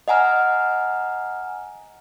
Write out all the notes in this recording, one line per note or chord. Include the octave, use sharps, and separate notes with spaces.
D#5 F#5 G#5 A#5 F6